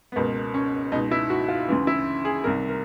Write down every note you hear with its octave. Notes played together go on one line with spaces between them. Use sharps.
B3
C#2 B2 A#3
C#4
C#2 B2 D#4
E4
F#4
F4
D2 C#3 E3
E4
G#4
C2 C3 D#3 A#4
A#4